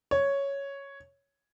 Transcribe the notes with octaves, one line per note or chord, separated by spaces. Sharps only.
C#5